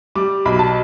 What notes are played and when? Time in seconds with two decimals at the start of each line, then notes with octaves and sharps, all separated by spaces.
0.16 G3 D6
0.45 B1 B5
0.59 A5